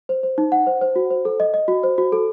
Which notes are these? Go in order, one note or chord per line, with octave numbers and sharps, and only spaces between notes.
C5
C5
D#4
F#5
C5
C5
F#4
C5
A4
D#5
D#5
F#4
C5
F#4
A4